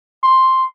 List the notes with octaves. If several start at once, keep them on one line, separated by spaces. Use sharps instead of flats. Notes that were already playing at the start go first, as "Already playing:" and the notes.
C6